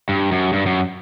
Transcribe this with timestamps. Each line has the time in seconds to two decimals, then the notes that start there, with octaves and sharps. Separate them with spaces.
0.09 G2
0.32 F#2
0.53 G2
0.66 F#2